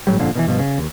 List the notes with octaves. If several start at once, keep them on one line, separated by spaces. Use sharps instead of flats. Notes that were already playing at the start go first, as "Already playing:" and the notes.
G1 A2 F#3 G3
G1 F2 A#2 D3
B2 D#3 E3
G2 B2 E3 F3
C#3
D#2